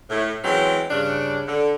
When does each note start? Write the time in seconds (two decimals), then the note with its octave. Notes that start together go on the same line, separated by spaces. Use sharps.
0.10 A2
0.44 E3 F#3 G#3 C4 C#4 E4
0.90 G2 C#3 D4
1.47 D3